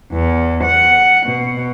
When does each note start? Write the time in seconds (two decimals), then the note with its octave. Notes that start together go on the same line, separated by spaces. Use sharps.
0.12 E2
0.63 F#5
1.26 B2